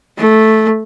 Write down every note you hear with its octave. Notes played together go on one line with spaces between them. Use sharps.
A3